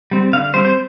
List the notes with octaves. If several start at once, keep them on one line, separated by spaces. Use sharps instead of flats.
G3 C4
D3 F5
G3 C4 C5
C5